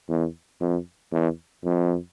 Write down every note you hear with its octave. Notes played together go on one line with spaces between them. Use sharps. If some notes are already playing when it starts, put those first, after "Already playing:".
E2
F2
E2
F2